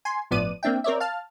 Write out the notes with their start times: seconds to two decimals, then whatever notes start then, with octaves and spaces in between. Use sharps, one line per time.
0.05 G#5 C6
0.31 G1 A2 F3 B3 D5 D#7
0.63 A#3 C4 D4 E5 G5
0.84 C4 A#4 C#5 D5 E5
1.00 F5 A5 F6